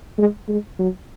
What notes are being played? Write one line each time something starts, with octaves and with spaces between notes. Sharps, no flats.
G#3
G#3
F#3